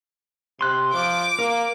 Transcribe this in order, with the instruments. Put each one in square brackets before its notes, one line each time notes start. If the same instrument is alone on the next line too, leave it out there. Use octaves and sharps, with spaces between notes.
[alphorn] C3 [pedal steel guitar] C6 F#6
[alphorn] F3 [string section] D6
[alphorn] A#3 [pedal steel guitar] A#4